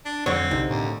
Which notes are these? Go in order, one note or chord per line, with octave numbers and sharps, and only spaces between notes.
D4
F2 D3 F#3 C4 C#5
B1 C3 D#4
D#2 A2